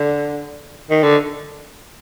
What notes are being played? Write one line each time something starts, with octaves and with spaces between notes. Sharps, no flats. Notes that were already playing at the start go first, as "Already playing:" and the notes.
Already playing: D3
D#3
D3